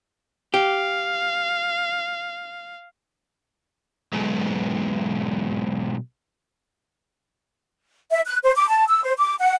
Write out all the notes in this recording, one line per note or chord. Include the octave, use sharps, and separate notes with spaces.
G4 F5
B1 G#2
E5
F#6
C5
D6
A5
E6
C5
D6
F#5